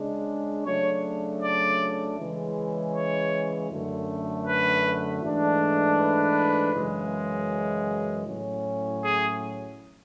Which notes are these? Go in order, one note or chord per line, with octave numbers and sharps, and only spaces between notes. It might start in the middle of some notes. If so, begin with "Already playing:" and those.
Already playing: C#3 G#3 D4
C#3 F#3 A3 D4 C#5
D5
C#3 E3 G#3
C#5
F#2 D3 A3
B4
G#2 E3 A3 D4
B4
F#2 C#3 E3 G#3
A2 F#3 C#4
G#4